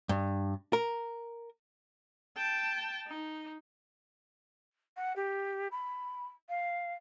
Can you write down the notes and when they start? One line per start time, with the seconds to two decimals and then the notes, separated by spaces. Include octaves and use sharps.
0.09 G2
0.73 A#4
2.37 G5 A5
3.07 D#4
4.97 F#5
5.16 G4
5.71 B5
6.49 F5